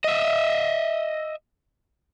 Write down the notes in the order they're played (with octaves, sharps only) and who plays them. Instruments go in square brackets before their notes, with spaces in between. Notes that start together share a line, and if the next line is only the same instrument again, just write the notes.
[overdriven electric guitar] D#5 E5